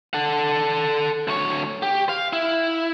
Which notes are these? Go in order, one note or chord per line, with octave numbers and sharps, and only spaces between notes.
A4 F#5
D2 C#5
G4
F5
E4